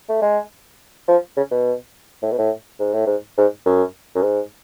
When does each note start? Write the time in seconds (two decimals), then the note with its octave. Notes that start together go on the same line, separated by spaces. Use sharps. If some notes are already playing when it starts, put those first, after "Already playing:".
0.09 A3
0.22 G#3
1.08 F3
1.37 C#3
1.51 B2
2.23 A2
2.31 B2
2.38 A2
2.80 G#2
2.93 A2
3.07 G#2
3.38 G#2
3.66 F#2
4.15 F#2
4.22 G#2